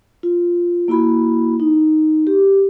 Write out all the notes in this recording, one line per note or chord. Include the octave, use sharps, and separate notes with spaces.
F4
A#3 E4 F#4 B5
D#4
G4